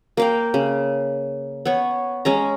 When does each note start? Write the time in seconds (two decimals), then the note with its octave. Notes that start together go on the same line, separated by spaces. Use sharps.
0.17 A#3 F5 G5
0.54 C#3
1.65 B3 C#5
2.25 G#3 C#4 A#5